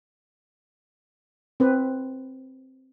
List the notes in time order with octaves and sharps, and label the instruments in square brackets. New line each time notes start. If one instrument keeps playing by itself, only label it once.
[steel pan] C4 B4